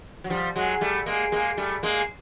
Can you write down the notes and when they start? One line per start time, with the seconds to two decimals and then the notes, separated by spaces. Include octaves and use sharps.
0.24 F#3
0.30 F3 G3
0.56 F#3 G#3
0.81 G3 A3
1.06 G#3 A#3
1.32 G#3 A#3
1.57 G3 A3
1.83 G#3 A#3